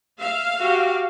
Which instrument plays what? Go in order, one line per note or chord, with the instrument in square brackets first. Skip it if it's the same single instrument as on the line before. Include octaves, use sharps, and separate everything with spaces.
[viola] E5 [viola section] F5
[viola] F#4 G4